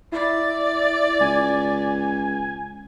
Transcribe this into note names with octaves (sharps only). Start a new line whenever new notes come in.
E4 D5
C#2 G#5